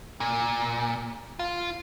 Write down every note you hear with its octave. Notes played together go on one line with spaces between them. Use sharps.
A#2
F4